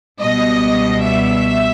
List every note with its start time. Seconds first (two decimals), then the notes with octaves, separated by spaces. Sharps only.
0.19 C#2 B2 G3 D#5
1.02 E5